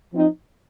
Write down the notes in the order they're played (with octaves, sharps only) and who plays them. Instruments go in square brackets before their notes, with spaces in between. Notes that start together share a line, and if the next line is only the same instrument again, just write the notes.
[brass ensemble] F3 C4 D#4